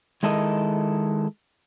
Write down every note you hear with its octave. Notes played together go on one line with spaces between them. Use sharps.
D#3 G#3 E4 A4 A#4 D#5